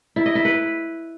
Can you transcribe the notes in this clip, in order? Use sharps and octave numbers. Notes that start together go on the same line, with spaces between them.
E4
D#5
E4
B4